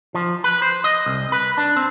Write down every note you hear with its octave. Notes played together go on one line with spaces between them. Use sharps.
F3
B4
C5
D#5
C2
B4
D4
C4